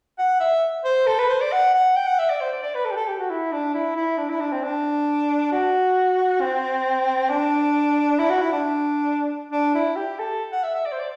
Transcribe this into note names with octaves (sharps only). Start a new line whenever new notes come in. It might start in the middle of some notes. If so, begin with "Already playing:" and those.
F#5
E5
C5
A4
B4
C5
D5
F#5
F#5
G5
F#5
E5
D5
C5
D5
D5
B4
A4
G4
A4
G4
F#4
E4
D4
E4
E4
D4
E4
D4
C4
D4
F#4
C4
D4
E4
F#4
E4
D4
D4
E4
G4
A4
F#5
E5
E5
D5
C5
D5